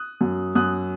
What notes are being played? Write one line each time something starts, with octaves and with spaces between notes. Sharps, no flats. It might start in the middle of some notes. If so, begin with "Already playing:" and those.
Already playing: D#6 F#6
F#2
F#2 D#6 F#6